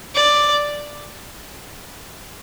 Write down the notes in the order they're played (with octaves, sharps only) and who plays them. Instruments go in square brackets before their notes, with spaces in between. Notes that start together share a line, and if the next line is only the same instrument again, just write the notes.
[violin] D5